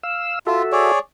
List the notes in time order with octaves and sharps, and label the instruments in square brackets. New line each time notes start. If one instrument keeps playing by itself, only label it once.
[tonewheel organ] F5 E6
[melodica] F4 [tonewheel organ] F#4 A4 E5
[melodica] G#4 C#5 D5